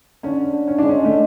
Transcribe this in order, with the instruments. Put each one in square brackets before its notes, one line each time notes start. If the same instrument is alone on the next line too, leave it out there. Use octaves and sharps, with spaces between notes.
[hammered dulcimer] D3 [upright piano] C#4
[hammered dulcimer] D3
[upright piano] C#4
[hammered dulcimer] G#3 [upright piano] D4
[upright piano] C#4
A3